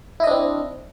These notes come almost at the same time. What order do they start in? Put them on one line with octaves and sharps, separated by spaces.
E4 D#5 D4 C4